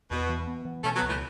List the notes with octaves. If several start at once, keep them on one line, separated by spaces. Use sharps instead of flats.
E2 B2
E3
B3
E3
B2 A3 C#4
F#3 B3
C#2
E3 A3